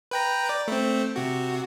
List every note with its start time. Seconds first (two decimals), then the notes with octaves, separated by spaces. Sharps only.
0.11 B4 G5 A#5
0.49 D5
0.68 A3 C4
1.16 C3 F#4